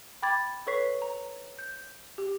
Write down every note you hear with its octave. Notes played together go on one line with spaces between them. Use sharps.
G5 B5 D6 G#6 A6
A4 B4 C#5 C#6 B6 C7
A#5
G6
G4